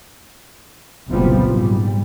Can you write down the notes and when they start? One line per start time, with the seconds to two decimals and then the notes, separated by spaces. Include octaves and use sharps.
1.07 F#1 C2 A#2 F3 G3 B3
1.51 G#2 G3